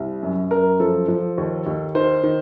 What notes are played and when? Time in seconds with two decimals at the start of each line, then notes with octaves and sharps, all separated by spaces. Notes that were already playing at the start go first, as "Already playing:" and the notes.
Already playing: C2
0.23 F#2
0.51 F#2 A#4
0.80 F3 A4
1.08 F3
1.38 D#2
1.66 D#2
1.95 D#3 C5
2.23 D#3